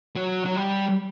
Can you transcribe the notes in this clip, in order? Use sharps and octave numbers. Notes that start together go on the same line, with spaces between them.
F#3
F#3
G3